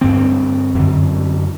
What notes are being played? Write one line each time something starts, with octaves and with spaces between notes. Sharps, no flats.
G2 D3 C4
F#2 D3